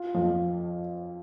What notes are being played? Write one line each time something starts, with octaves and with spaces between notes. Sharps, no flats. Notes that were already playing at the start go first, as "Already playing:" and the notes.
Already playing: F4
F2 F3